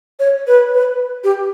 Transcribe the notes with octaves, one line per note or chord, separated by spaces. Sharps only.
C#5
B4
B4
G4